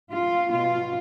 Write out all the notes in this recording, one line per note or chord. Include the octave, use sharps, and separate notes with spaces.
F4
B2 F4